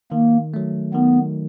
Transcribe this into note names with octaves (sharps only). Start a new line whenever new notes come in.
D#3 A#3
F#3 A3
D#3 B3